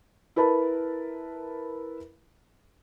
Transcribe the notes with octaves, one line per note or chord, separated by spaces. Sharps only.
E4 A#4 B4 A5 B5